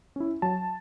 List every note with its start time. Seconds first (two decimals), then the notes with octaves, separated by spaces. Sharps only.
0.16 C#4 E4
0.42 F#3 A5